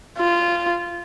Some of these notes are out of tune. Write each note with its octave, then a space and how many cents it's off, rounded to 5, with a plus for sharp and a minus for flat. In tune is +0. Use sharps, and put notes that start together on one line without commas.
F4 -15